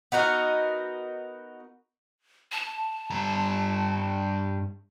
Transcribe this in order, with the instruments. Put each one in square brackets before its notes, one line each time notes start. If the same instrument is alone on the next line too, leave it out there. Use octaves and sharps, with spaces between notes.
[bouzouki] B3 D#4 F#4 A#4
[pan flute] A5
[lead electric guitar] G2 A#5